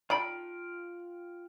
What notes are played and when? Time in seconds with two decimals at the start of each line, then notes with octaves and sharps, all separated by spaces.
0.10 D#4 F4 A4 D5 G5 B5